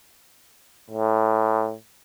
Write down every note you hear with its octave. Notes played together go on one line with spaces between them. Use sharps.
A2